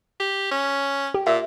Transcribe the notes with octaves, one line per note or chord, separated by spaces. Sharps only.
G4
C#4
G4
A#2 E5